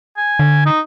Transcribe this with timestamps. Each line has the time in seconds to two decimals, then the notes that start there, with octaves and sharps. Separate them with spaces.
0.17 G#5
0.39 D3
0.66 D#4